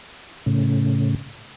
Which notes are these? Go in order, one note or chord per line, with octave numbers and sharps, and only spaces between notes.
A2 C#3